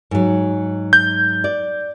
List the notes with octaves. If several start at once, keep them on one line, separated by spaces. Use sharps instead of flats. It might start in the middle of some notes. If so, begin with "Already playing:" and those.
G#2 F#3
G6
D5